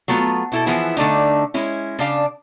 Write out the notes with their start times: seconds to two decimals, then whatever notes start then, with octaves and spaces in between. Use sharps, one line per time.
0.08 F#3 A3 B3 F4
0.52 B2 E4 A4
0.66 E3 F3 B3 E4 G#4
0.97 D3 A3 D4 D#4
1.54 G#3 C#4 E4
1.99 C#3 D4 F5